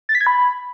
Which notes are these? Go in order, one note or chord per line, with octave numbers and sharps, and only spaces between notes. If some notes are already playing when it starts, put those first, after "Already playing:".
A6
B6
G#6
B5